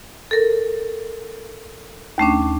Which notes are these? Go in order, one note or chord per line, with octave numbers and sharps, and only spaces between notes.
A4 A#4
D#2 A3 C#4 D4